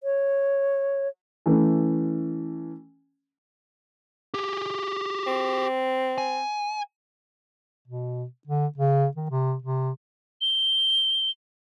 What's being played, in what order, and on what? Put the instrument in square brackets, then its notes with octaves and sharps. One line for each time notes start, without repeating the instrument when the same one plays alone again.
[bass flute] C#5
[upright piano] E3 A3 C#4
[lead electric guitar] G4 G#4
[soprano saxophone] C4
[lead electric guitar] G#5
[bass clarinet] B2
D3
C#3
D#3
C3
C3
[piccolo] G7